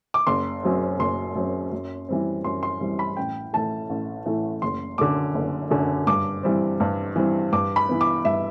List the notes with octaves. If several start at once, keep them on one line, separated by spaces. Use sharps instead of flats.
D6
F#1 C6
F#2 F#3 C4
F#1 C6
F#2 F#3 C4
F#2
E3 G3 C4
F#2 C6
C6
E3 G3 C4
B5
A1 G5
A2 E3 A3 A5
A1
A2 E3 A3
F#1 C6
F#2 D3 D6
F#1
F#2 D3
G2 D6
E3 G3 C4
G2
E3 G3 C4
G2 D6
B5
E3 B3
D6
G2 E5